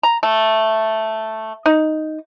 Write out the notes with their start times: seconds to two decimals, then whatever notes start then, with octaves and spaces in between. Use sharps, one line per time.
0.03 A#5
0.23 A3
1.66 D#4